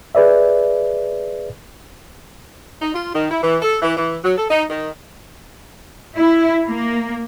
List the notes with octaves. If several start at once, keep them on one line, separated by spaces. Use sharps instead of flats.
G#4 B4 D5 E5
D#4
F4
D#3
E4
E3
A4
E3
E3
F#3
A4
D#4
D#3
E4
A#3